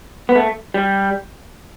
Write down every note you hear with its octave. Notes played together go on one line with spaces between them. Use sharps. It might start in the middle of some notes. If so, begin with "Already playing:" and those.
B3
A3
G3